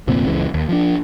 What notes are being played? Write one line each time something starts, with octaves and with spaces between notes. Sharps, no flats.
F1 D2 A#2 C4
F#1 C#2 C#3 E3
D#2
F3 D4